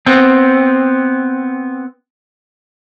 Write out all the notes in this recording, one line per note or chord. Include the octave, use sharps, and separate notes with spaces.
B3 C4